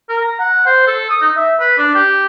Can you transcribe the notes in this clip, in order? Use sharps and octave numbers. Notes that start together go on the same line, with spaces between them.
A#4
A#5
F#5
C5
A4
D#6
D#4
E5
B4
D4
G4